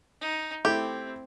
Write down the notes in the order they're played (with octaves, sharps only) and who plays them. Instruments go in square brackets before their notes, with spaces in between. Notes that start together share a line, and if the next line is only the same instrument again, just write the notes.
[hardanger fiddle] D#4
[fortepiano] A3 E4 [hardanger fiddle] C4 [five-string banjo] G4